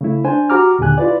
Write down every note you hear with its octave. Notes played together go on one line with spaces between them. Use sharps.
C#3 A3 E4
D4 C5 G#5
F#4 G4 A#5 D6 F6
D#2 A#2 D3 G4 G#5 F#6
E4 F4 B4 D5